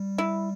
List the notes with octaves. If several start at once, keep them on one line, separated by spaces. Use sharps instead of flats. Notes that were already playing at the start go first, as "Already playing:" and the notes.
Already playing: G3
E4